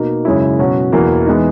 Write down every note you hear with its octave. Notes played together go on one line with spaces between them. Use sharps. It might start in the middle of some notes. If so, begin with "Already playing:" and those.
Already playing: B2 A#3 D#4
F#2 C#3 G#3 C#4 E4
B2 F#3 C#4 F#4
E2 B2 A#3 E4
E3 G#3 B3 D#4